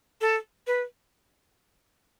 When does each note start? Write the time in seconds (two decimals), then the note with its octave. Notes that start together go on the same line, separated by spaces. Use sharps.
0.21 A4
0.67 B4